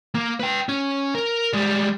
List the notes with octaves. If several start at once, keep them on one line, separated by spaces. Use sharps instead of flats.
A#3
B4 G5
C#4
A#4
G3 G#3